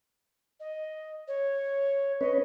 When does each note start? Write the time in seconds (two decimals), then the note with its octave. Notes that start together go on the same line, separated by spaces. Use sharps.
0.60 D#5
1.28 C#5
2.21 C#4 B4 C#5 D#5